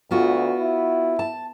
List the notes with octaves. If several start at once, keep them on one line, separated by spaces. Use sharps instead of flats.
D2 B3 F4 F#4
E4
A5